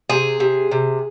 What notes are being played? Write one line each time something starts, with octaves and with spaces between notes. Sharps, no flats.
C3 G#4
C3
C3